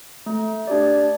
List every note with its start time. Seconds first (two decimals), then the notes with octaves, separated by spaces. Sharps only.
0.26 A3
0.67 D4 G4 D5